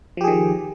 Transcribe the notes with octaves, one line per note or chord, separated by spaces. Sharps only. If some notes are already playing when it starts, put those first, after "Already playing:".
D#3 F3 G4 G#4